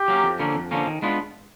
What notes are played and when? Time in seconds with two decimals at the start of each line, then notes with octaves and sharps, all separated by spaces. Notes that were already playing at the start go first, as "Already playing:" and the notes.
Already playing: G4
0.08 F#3 A#3 C#4
0.24 F2
0.39 D3 F3 A#3 C#4
0.55 F2
0.71 D3 F3 A#3 C#4
0.87 D#3
1.02 G#3 B3 D4 F4